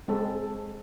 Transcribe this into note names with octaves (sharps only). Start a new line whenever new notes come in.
G#3 C4 A4